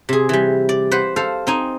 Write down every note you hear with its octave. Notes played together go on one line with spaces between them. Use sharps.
C3 G#4
E3 G3
D5
B4 C5 F#5
A4 C5 F5
C4 D#4 G#5